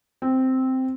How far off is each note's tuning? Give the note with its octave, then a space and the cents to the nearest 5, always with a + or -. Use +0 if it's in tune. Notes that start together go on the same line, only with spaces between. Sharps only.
C4 -5